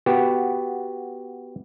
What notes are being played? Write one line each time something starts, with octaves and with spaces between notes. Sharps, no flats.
B3 F#4 G4